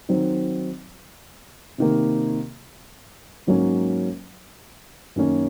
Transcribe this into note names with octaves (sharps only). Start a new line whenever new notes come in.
D#3 F#3 C4 D#4
C3 D#3 A#3
G#2 F#3 A#3 C#4
F#2 D#3 A#3 C#4